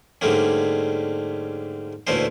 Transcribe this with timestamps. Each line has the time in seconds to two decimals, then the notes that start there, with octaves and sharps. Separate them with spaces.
0.21 G#2 D3 G3 A3 A#3 C#4
2.07 D2 A#2 E3 A3 C#4 C5